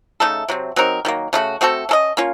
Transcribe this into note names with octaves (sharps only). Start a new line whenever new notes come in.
C#3 A3 D#4 A4
C3 F#3 C4
F#3 C4 D#4 A#4
D#3 F#3 A#3
C#3 A3 D#4 F#4
A3 C4 F#4 A4
C#4 A4 D#5
A#3 C#4 F4